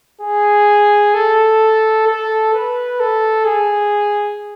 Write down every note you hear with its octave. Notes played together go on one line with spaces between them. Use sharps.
G#4
A4
A4
B4
A4
G#4